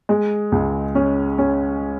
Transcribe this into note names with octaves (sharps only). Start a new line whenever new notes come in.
G#3
C#2
C#4
C#4